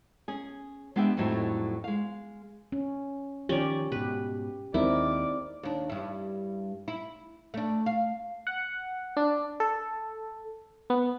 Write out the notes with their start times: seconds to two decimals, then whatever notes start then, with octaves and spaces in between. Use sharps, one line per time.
0.28 C#4 G#4
0.96 G#3 B3 D4 G4 E5 G5
1.17 F2 A2 F#3 G3 D#4 E4
1.84 G#3 F5
2.72 C#4
3.49 D#3 F3 C#4 G4 D5
3.92 G#2 B2 G4 B4
4.74 D#2 G#3 C4 D#4 E4 A#4 D5
5.63 D#2 D4
5.89 G2 E4
6.88 E4
7.54 A3 D4
7.86 F5
8.47 F#5
9.17 D4
9.60 A4
10.90 B3